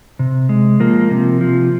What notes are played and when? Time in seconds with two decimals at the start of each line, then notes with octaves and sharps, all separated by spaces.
0.19 C3
0.49 G#3
0.80 F3 A#3
1.11 C3
1.41 F3